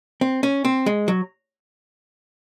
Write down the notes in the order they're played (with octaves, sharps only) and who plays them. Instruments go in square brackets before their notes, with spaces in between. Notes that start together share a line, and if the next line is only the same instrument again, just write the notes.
[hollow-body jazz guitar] C4
C#4
C4
G#3
F#3